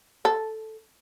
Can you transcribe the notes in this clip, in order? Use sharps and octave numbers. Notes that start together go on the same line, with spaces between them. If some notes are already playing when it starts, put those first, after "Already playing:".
A4